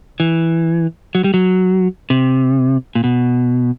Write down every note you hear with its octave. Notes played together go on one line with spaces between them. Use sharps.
E3
F#3
G3
F#3
C3
A#2
B2